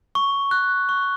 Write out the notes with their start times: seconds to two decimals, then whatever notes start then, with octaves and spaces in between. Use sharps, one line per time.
0.15 C#6
0.51 F#6
0.89 C#6